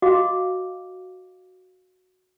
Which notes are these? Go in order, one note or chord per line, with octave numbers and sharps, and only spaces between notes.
F#4 D#5 F5 D6